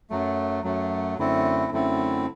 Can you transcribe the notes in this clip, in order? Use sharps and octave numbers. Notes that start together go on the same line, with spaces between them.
F#2 F#3 A3
F#2 F#3 A3
F#2 D3 A3 C4 E4
F#2 D3 A3 C4 E4